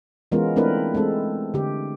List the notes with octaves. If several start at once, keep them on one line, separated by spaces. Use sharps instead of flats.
E3 G#3 B3 C#4 F4 A#4
A3 C4 D4 E4 A#4 B4
G#3 A3 C4 A4
D3 G4